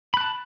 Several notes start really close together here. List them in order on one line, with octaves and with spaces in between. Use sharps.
B5 F#6 A5